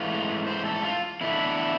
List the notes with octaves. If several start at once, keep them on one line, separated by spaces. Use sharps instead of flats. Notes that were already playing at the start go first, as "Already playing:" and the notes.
Already playing: G#2 E3 A3 F4
C5
A4
F4
E2 D3 A3 E4